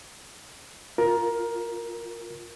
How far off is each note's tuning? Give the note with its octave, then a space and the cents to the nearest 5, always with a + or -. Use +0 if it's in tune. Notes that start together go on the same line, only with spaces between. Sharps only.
F4 +0 A#4 +15